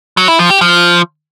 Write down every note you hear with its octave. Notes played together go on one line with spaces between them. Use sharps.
F#3
E4
F3
G4
F3